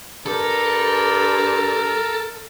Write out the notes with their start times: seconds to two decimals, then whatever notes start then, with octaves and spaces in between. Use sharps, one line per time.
0.26 G2 A4 A#4